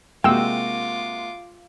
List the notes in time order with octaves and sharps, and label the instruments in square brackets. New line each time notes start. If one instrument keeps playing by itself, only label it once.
[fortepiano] C3 G#3 F#4 [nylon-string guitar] A#3 [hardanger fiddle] F4 D6 [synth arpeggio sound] G5 E6